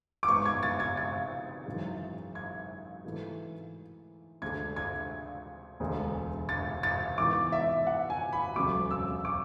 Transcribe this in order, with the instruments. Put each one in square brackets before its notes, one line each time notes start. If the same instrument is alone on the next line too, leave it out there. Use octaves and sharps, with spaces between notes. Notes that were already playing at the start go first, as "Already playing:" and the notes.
[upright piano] D6
G#1 G#2 G#3 B3 C#6
G#6
A6
G#6
A6
G#1 F#2 E3 G#3
G#6
G#2 E3 A3
D2 D3 G#3 D4 G#6
G#6
E1 D2 D3 G#3
A6
A6
G#2 E3 B3 D6
E5
F#5
G#5
B5
E1 D2 C#3 F#3 A3 D6
E6
D6